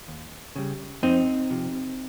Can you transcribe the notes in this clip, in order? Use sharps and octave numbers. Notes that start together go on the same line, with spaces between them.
D#2
C#3 G3
F2 C4 D#4
C3 F3